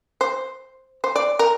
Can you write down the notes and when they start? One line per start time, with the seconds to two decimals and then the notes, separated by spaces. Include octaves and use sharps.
0.21 C5
1.04 C5
1.16 D5
1.39 A#4